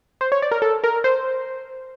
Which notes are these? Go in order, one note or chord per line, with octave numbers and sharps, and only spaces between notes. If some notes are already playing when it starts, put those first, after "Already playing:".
C5
C#5
D5
A#4
A4
A#4
C5